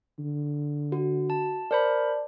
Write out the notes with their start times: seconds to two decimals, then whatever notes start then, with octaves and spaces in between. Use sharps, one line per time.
0.19 D3
0.92 F#4
1.30 A5
1.71 A#4 C5 D5 A5 B5